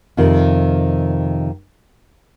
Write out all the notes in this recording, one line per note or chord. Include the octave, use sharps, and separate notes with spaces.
F2 C3 D#3 F4